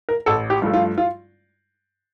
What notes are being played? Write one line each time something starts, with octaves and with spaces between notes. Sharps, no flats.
A#4
A1 A4
G4
G2 F3 A3
F4
F4